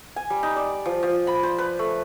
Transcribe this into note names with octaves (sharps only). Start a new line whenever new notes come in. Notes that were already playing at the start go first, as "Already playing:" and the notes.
G#5
G3
D#4
D5
F3
F3
B5
C5
B4
A3